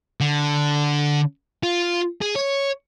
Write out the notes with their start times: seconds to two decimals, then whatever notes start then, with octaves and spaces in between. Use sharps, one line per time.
0.20 D3
1.63 F4
2.21 G#4
2.35 C#5